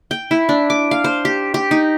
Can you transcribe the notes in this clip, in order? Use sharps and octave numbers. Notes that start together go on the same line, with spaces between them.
G5
E4
D4
D6
F5
C5
G4
G4
D#4